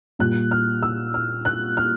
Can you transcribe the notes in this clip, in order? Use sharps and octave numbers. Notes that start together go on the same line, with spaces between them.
A#2 G3 F#6
F6
E6
F6
F#6
F6